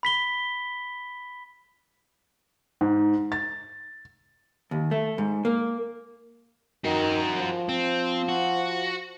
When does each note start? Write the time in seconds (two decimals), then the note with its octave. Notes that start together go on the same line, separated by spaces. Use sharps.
0.03 B5 B6 G7
2.81 G#2
3.32 A6
4.71 D#2
4.91 A3
5.18 G#2
5.45 A#3
6.84 D#3 F#4 A#4
7.37 F3
7.69 C4
8.29 F#4